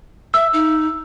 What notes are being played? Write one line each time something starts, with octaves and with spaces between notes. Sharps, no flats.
E5 E6
D#4